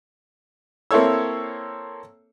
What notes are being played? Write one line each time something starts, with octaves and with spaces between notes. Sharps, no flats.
A#3 C4 E4 A4 C#5 E6